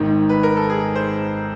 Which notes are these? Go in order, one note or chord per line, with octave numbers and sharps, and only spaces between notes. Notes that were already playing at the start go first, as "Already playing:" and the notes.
Already playing: G#1 G#2 D#3
B4
A#4
A4
G#4
C5